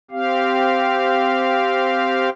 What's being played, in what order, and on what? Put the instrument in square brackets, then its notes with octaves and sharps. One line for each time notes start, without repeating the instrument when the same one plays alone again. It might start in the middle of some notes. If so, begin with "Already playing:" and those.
[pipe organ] C4 G4 F5